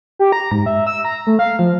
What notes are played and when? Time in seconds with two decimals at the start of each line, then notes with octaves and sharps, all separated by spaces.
0.19 G4
0.32 A#5
0.51 G#2
0.66 E5
0.87 E6
1.05 A#5
1.27 A3
1.39 F5
1.59 F3